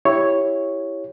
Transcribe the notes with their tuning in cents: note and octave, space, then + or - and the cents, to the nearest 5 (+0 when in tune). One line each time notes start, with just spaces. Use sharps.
E4 +0 G4 +0 C#5 +0